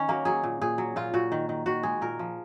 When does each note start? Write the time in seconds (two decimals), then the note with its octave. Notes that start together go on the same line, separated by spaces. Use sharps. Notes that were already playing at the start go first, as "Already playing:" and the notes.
Already playing: D#3 C#4
0.08 F#3 A#3
0.25 F#3 G#4
0.43 A#2
0.61 A#2 G#4
0.78 F#3
0.96 A#2 F4
1.14 A#2 F#4
1.32 D#3
1.49 D#3
1.66 D#3 F#4
1.83 G#3 G#4
2.01 A#2 A#4
2.19 F3